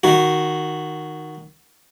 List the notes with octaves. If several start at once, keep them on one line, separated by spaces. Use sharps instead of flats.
D#3 F#4